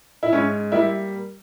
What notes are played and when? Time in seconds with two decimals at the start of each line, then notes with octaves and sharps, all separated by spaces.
0.23 E4
0.33 G#2 C#4
0.72 G3 A#3 E4